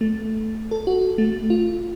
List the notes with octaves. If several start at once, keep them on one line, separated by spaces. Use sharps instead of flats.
A3
A4
F#4
A3
F4